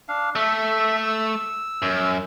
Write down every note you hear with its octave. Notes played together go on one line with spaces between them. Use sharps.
D4 F5
A3 A4 E5
E6
F#2